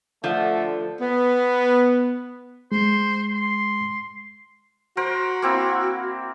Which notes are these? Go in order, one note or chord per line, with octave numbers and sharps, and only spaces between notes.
D3 F3 A3
B3
G#3 C5
C6
F#4 A#4 C5
A#3 C4 E4